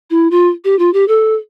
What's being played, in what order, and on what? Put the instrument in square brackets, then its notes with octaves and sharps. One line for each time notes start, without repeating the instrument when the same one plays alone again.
[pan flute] E4
F4
G4
F4
G4
A4